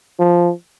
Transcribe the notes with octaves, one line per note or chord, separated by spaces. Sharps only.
F3